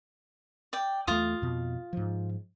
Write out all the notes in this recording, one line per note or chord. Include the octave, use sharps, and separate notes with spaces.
D5 G5
E2 A3 F4 D#6
F2 B2
G#2 F3